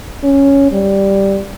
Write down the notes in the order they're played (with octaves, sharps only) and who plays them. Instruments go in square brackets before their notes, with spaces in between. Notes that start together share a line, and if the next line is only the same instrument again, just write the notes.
[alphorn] C#4
G3